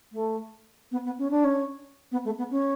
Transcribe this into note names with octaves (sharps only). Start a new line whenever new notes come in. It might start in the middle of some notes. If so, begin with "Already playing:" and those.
A3
B3
B3
C#4
D4
C#4
B3
A3
B3
C#4